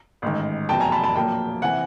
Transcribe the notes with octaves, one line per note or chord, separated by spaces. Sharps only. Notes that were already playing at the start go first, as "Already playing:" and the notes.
A1 G#2 D#3
F1 E2 B2 F#3 G5 A5
G#5 A#5
A5 B5
A5 B5
A#1 A#2 F#3 A#3 G5 A5
C3 E3 F#5 G#5